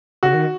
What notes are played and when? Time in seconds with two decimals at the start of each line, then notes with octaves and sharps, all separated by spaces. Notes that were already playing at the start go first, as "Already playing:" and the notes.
0.23 C#3 F#4
0.34 D#3